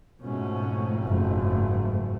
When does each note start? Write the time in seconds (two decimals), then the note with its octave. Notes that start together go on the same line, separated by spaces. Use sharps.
0.21 F2 G#2 B2 A3 C#4
1.02 F#1 F#2